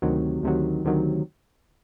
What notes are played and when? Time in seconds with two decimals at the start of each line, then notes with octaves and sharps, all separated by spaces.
0.02 D2 C3 D#3 F#3
0.43 D2 C3 D#3 F#3
0.84 D2 C3 D#3 F#3